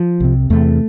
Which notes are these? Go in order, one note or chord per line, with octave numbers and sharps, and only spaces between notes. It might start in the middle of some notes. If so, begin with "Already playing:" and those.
Already playing: F3
C2 C3
E2 C3 A3